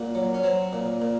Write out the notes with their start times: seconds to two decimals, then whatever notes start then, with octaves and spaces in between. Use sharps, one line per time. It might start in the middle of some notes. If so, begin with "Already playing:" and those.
Already playing: A#2 F#4
0.15 F#3
0.34 C#4
0.44 F#3 C4
0.73 A#2
1.02 A#2